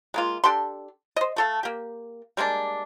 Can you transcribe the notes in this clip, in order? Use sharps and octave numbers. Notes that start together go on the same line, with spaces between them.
G#3 A#3 F4
D4 G4 A4 C6
C5 D#5
A3 A4 F5
A#3 G4
G3 G#3 A#3 D4